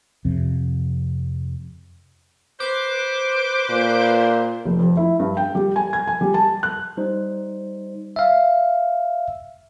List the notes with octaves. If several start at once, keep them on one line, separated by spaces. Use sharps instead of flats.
F2 C3
B4 C5 D6
A#2
F1
F2
E4
G2
G5
G3
G#5
G#6
G#5
G3
A5
F#6
G3 D#4 C5
E5 F5